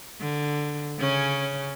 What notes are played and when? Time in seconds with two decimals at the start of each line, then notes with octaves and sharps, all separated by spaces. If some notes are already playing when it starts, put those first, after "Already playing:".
0.20 D3
0.98 C#3 C#4